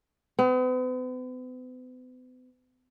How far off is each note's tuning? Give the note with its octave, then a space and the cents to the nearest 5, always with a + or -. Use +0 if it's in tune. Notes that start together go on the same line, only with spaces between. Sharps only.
B3 +45